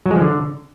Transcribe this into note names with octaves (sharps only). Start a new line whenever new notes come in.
F#3
G#3
F3
D3